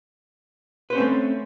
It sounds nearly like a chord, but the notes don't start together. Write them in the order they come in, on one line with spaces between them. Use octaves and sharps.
B4 C5 C#4 C4 A3